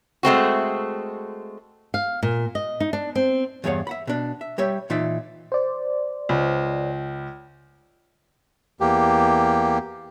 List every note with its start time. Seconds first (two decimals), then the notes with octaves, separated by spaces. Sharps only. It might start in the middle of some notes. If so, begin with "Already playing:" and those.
0.23 G#3 A3 C4 F#4
1.94 F5
2.23 A#2
2.55 D#5
2.80 D#4
2.93 D4
3.15 C4
3.64 E2 G2 G#4 C#5 F5 F#5
3.87 E5 F#5 B5
4.07 B2 D4
4.41 E5
4.58 G3 G4 C#5 E5
4.90 A#2 E3 D#4 F4 D5 E5
5.52 C5 D5
6.29 C#2
8.81 E2 A#3 G4